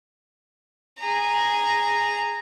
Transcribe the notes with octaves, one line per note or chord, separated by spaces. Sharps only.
G#4 A#5